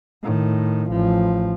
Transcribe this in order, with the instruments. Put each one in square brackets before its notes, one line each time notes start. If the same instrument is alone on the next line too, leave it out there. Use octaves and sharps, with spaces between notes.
[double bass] A2 D#3
A1 F3